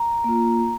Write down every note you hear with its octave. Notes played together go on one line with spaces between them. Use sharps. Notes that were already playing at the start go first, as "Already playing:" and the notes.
Already playing: A#5
A#3 F4